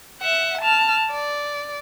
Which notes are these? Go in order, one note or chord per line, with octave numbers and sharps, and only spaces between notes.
E5 F#5
A5 F6
D5